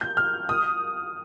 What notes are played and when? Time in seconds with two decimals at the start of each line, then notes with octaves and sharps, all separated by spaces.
0.01 G6
0.17 F6
0.49 D#6